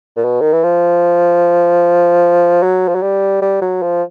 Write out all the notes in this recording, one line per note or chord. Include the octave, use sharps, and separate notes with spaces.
A#2
B2
D#3
E3
F3
F#3
F3
F#3
G3
G3
F#3
F3